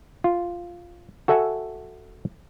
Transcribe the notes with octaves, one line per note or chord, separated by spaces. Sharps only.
F4
F#4 A4 E5 F#5 G#5